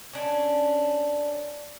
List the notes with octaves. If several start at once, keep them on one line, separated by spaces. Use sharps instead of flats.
C#4 D4